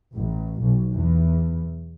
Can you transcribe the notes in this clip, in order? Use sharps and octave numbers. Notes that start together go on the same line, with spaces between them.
A1
B1
E2